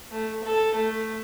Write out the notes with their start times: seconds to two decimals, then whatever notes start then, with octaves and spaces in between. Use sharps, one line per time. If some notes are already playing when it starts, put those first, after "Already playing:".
0.11 A3
0.44 A4
0.75 A3